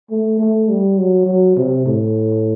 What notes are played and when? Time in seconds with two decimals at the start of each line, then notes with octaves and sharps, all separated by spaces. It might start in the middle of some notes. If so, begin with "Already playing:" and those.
0.11 A3
0.39 A3
0.69 G3
0.98 F#3
1.27 F#3
1.57 C3
1.86 A2